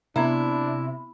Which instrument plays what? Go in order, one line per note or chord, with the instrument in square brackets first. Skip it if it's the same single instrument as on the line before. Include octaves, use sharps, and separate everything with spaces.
[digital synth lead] C3 [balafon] B3 E5 A#5 [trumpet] D4 [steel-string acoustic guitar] E4